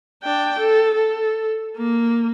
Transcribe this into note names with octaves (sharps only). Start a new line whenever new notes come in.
D4 G5
A4
A4
A#3